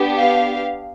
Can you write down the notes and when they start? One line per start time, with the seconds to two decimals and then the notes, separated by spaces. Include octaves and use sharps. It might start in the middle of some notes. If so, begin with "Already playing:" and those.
Already playing: B3 D4 G4
0.18 F5